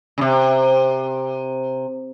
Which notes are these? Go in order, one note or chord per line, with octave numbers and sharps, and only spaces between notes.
C#3
C3